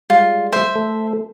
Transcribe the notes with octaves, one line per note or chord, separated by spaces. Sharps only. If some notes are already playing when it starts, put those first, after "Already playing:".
G3 G#3 F4
C5 E5
A3 A4